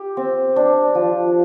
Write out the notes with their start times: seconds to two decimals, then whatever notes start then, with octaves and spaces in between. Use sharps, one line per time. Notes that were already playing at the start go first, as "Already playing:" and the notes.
Already playing: G4
0.17 C4
0.56 D4
0.95 F3